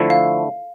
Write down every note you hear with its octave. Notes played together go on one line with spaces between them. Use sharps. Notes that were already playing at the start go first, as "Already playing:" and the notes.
Already playing: D3 F3 A3 E4
F5